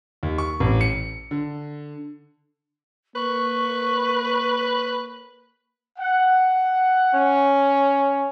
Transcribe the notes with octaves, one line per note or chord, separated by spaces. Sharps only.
D#2
C#6
A1
C#7
D3
A#3 B4 C#6
F#5
C#4